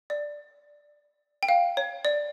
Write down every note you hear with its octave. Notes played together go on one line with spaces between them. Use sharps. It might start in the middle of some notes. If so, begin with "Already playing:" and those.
D5
G5
F5
C#5
D5